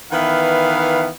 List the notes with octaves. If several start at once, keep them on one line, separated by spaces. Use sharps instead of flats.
D#3 E3 B3 B4 E5 F5